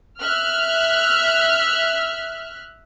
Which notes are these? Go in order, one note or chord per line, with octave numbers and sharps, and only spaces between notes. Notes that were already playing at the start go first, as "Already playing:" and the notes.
E5 F6 F#6